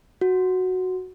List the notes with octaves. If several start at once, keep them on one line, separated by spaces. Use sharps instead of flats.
F#4